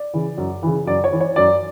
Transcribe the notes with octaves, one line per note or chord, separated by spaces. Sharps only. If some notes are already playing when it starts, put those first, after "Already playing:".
Already playing: D5
C#3 E3
F#2
C#3 E3
F#2 D5
C#5
E3
C#5
F#2 D5